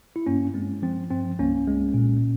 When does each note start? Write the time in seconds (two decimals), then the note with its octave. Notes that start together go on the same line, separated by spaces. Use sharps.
0.16 E4
0.26 G2 A#3 C#4
0.54 G#3 C4
0.82 F3 C4
1.11 G2 C4
1.39 C2 A#3 C#4
1.67 G#3
1.94 A#2